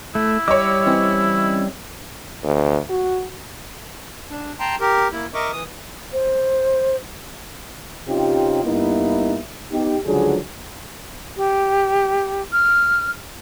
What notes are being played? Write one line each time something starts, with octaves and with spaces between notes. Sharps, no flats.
A3 E4
G3 C#5 D#5 D6 E6
E3 C4 C#4
D2
F#4
D4
G5 A5 A#5 C6
G4 A#4
A#3 E4
A#4 D#5 E5 C#6 D6
E3 D#6
C5
C3 C4 C#4 D#4 F4 G4
G2 A#3 B3 D#4 E4
B3 D#4 G4
C#2 D3 F3 F#3 G#4
G4
F6